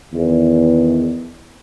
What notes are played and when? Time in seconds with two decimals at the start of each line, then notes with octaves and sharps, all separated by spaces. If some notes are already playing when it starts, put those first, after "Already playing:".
0.13 E2 D#3